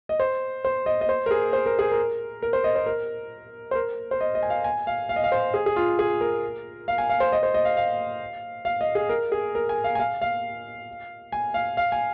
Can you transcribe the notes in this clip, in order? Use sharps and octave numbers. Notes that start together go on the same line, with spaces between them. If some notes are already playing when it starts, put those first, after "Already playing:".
D#5
C5
C5
D#5
D#5
C5
A#4
G#4
C5
A#4
G#4
A#4
A#4
C5
D#5
C5
A#4
C5
A#4
C5
D#5
D#5
G#5
F5
G#5
F5
F5
D#5
F5
C5
G#4
G#4
F4
G#4
A#4
F5
G#5
F5
C5
D#5
C5
D#5
F5
F5
F5
D#5
G#4
A#4
G#4
A#4
G#5
F5
G#5
F5
F5
G#5
F5
F5
G#5